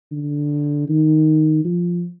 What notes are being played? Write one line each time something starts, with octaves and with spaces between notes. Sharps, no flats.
D3
D#3
F3